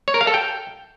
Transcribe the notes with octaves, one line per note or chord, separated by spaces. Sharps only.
C#5
A#4
F5
A4
G5